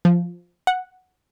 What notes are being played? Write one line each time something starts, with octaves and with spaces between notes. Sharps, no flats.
F3
F#5